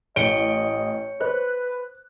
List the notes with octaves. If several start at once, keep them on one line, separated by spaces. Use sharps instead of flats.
A1 C#5 D#5 C#7 D7 G7
B4 C5 F#6